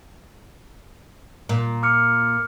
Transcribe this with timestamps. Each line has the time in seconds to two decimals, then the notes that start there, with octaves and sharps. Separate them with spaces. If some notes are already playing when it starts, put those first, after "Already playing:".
1.49 A#2
1.83 D6 F6 C#7